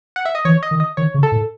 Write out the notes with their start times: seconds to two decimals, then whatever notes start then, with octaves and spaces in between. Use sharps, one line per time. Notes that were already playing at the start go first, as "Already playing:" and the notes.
0.16 F#5
0.25 E5
0.35 D#5
0.45 E3 C#5
0.63 D#5
0.71 D#3
0.80 D#5
0.97 D#3 C#5
1.14 C#3
1.23 A4
1.32 A2